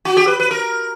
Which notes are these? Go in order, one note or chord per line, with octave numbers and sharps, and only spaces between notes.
F#4
G4
B4
B4
A#4